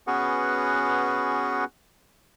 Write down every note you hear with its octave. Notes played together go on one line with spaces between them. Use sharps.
B3 C#4 F#4 G#4 B4 F#5